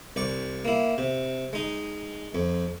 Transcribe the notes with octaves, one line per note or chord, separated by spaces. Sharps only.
C2 D5 C#6
A#3 E4
C3
G#3 D#4
F2